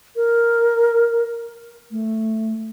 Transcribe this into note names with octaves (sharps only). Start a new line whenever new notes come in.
A#4
A3